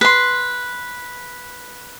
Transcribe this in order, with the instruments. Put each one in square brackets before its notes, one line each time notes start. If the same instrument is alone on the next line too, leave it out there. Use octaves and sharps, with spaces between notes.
[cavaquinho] B4 C6